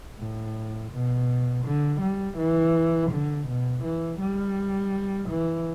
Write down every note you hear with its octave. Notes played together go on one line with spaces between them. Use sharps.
A2
B2
D3
G3
E3
D3
B2
E3
G3
E3